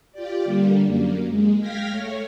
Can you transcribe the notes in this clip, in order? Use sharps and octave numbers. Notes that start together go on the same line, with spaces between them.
F4 G4 D5
D3 G3 A#3
F#2 A#3
G#3
F5 G5 F6 G#6 A#6 B6
A3 C#5